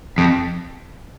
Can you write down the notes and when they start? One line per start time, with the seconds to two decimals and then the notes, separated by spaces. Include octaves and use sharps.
0.18 F2